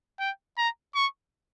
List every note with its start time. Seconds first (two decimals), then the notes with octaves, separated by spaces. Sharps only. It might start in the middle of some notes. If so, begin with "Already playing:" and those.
0.19 G5
0.57 A#5
0.95 C#6